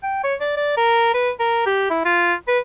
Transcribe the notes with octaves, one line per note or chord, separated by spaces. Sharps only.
G5
C#5
D5
D5
A#4
B4
A#4
G4
E4
F4
B4